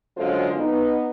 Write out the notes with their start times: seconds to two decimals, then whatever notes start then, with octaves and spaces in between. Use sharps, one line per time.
0.17 F#2 D3 F#3 G#3 F4 C5
0.57 B3 D#4